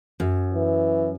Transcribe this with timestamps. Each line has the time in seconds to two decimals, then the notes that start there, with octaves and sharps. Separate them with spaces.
0.20 F#2
0.54 E3